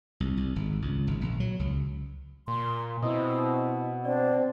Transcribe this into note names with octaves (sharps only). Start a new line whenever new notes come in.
C2
C2
G#1
C#2
G#1
A#1
F#3
C#2
A#2 C6
B2 C4 E4 D#5 D#6
C4 D4 D5